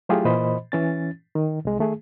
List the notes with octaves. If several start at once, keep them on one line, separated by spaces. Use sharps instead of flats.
F#3 A3 E4 F4 G4 G#4
A#2 E3 C5 D#5 B5
E3 C#4 A6
D#3
C2 G#3
D#3 A3 G#4